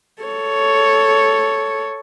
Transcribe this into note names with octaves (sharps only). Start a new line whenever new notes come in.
A4 C#5